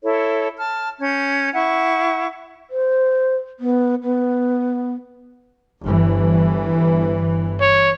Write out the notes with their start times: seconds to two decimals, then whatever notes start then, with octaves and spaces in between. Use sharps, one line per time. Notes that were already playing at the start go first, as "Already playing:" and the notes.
0.03 E4 A4 C#5
0.57 A5 F6
1.01 C#4 G6 G#6
1.55 E4 F#5 C#6
2.70 C5
3.59 B3
4.03 B3
5.83 G1 E3
7.61 C#5